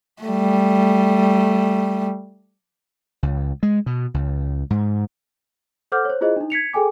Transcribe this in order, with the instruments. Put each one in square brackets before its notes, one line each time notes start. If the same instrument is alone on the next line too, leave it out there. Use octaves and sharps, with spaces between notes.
[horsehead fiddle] G3 A3
[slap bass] C#2
G#3
B2
C#2
G#2
[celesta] A4 C5 F#5 D6 F6 G6
C5 C#5
E4 F4 G#4 C5 D#5
D4 D#4
G#6 B6 C#7 F7
G#4 A4 G5 G#5 D6